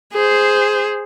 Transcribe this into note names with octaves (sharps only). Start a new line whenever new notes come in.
G#4 C5